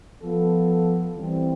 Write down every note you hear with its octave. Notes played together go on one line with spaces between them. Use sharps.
F3 B3 F4 A4
E3 G3 C4